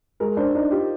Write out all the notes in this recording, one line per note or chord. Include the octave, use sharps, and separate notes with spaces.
G#3 A#4
D4 C5
D4 D#4
F4 G4